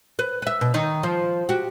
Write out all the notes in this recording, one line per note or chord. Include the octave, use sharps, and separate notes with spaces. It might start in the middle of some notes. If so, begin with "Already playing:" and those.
B4
B4 E5
B2
D#3 D#4
F3
F#4 G4